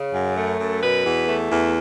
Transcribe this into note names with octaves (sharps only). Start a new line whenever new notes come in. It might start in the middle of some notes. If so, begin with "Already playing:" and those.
Already playing: C#3
F#2
A3
F#2
B2 B4
E2
A3
E2